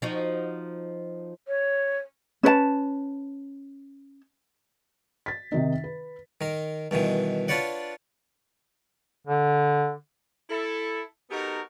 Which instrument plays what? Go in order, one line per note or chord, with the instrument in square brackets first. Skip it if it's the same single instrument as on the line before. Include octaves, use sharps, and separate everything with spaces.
[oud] F3 D#4 F#4
[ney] C#5
[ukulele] C#4 B4 C#5 A5
[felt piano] A6 B6
C3 D#3 D#4
B4
[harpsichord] D#3 A#4
G2 B2 D#3 E3
D4 F4 B4 C#5 D5 F#5
[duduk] D3
[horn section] E4 A4
B3 D#4 F#4 G4 A4 A#4